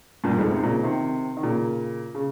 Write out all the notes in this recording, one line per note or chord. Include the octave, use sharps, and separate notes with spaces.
G2 A#2
F2 G#2
G#2 C3
A#2 C#3
C3 D#3
D#3
A#2 C#3
C#3